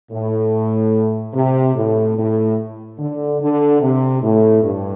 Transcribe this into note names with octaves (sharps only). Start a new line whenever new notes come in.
A2
C3
A2
A2
D3
D3
C3
A2
G2